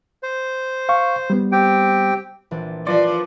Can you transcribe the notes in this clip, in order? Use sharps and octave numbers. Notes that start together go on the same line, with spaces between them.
C5
F5 C#6
G3 B3
C4 G4 G5
A#1 E3 D4
F3 A#4 B4 D5 C6